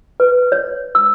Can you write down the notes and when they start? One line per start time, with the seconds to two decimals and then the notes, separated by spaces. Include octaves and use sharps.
0.20 B4
0.52 C#5
0.95 E6